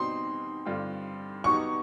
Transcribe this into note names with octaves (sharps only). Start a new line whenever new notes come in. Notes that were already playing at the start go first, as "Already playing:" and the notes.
Already playing: B2 G3 C4 D#4 C6
G2 D3 G3 C4 F4
B2 F#3 B3 D#4 G4 C#6